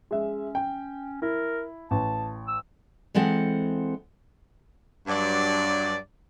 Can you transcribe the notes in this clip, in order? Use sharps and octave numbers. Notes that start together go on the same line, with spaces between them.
G#3 C#4 E5
G5
E4 A#4
A1 A5
E6
E3 G#3 C4 A4 F#5
G2 F#3 D5